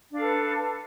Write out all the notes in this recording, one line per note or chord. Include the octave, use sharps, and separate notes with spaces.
D4 A4 B4 F5